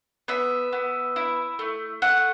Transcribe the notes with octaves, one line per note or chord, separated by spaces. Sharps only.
B3 E5
B3
E4
A3
A3 F#5